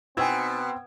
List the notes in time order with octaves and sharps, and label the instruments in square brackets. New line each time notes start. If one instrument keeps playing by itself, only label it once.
[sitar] B2 [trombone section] B3 C4 [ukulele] D#4 G#5 [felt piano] G5 E6 G#6